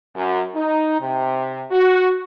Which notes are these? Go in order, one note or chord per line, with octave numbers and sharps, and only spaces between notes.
F#2
D#4
C3
F#4